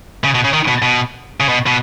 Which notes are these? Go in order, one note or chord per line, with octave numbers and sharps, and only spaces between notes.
C#3
B2
C#3
D#3
B2
B2
C#3
B2
B2